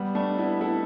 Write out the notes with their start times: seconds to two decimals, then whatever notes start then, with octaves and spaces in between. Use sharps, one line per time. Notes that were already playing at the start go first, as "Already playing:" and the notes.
Already playing: G3 B3
0.15 A3 D4
0.38 B3 E4
0.61 E4 A4